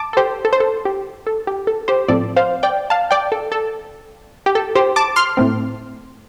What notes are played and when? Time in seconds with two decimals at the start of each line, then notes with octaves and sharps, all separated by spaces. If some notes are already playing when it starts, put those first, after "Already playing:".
Already playing: A5 D6
0.13 A4
0.17 G4 C5
0.45 A4
0.53 C5
0.60 A4
0.85 G4
1.27 A4
1.47 G4
1.67 A4
1.88 G4 C5
2.08 A2 F3 C4 A4 D5
2.36 C5 F5
2.63 D5 G5
2.90 F5 A5
3.11 D5 G5
3.32 A4
3.52 A4
4.46 G4
4.55 A4
4.75 G4 C5
4.96 A5 D6
5.16 C6 F6
5.37 A2 A3 C4